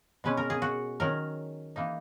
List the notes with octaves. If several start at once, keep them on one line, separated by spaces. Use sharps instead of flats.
B2 G#3 C#4 B4
A#4
G#4
F#4
D#3 F#3 C#4 A#4
E3 A#3 D#4